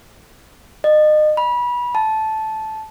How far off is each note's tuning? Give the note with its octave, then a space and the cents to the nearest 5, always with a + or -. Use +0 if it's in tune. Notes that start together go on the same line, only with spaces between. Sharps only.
D#5 -30
B5 -25
A5 -10